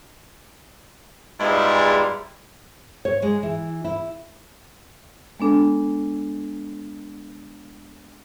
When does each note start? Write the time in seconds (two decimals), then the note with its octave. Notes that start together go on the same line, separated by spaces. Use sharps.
1.40 G#2 G3 G#3 B3 E4 F4
3.05 C#5
3.22 G#3
3.43 E3
3.84 E4
5.40 G#3 B3 D4 A4